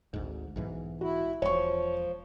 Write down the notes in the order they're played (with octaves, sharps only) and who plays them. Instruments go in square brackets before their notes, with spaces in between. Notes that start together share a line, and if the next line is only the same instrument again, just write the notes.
[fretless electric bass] G#1 D2 G#2
B1 G#2 E3
[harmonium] E4 [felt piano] F#4
[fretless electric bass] E1 [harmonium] F3 [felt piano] C#5 C#6